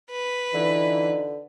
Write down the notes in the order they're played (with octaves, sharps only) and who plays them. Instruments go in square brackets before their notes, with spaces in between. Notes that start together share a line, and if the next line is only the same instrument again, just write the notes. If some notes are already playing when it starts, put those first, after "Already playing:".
[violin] B4
[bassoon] D3 [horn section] E3 [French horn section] D#4 F4 D5